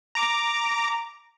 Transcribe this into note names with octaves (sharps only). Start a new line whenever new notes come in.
A#5 D6